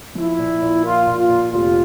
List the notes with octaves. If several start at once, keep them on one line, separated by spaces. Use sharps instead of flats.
F3 E4
A#2
A#2
A#3 F4
A#2
F4
A#2
F1 F4